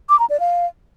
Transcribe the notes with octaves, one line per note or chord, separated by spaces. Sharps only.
D6
A#5
D5
F5